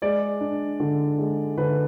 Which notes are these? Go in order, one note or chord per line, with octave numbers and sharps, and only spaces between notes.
G#3 D5
D4
D3
G#3
D3 B4